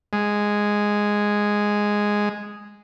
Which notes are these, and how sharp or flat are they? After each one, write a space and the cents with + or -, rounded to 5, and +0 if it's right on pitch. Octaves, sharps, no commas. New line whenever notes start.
G#3 -5